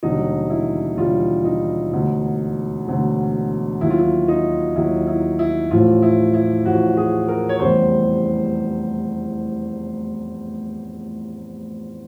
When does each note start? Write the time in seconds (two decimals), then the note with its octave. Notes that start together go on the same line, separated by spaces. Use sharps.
0.03 E1 D#2 D3 G3 D#4
0.50 E4
0.97 E1 D#2 D3 G3 F4
1.44 D#4
1.92 E1 D2 D3
2.87 E1 D2 D3
3.81 D#2 D#3 F#3 E4
3.90 F4
3.99 E4
4.28 D#4
4.76 D#2 D#3 F#3 E4
5.07 E4
5.39 E4
5.71 A1 A2 F3 F4
6.02 E4
6.34 E4
6.65 A1 A2 F3 F#4
6.97 G#4
7.28 A#4
7.49 C#5
7.60 F1 E2 C#3 E3 G3 C5